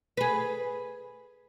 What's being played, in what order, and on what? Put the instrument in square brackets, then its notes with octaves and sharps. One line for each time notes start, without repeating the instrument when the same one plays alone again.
[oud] G#4 B4